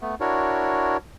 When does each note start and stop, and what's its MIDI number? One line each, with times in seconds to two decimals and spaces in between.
0.01 0.15 57
0.01 0.15 59
0.21 0.97 62
0.21 0.97 64
0.21 0.97 66
0.21 0.97 70
0.21 0.97 73